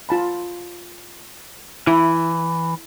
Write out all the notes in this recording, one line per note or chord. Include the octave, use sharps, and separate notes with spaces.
F4 A5 B5
E3 E4 B5